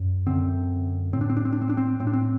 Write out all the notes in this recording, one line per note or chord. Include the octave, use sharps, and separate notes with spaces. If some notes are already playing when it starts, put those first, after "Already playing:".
Already playing: F#2
F#2 D3 C4
A2 C4
D4
C4
D4
C4
D4
C4
D4
C4
A2 C4
D4
C4